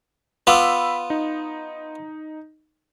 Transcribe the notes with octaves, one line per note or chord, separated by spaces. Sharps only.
B3 F4 B5 D6 E6
D#4